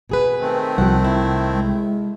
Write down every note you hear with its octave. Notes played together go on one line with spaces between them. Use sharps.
B2 G#4 B4
D#3 A3 C4
C2 F3 F#5
E4
G#3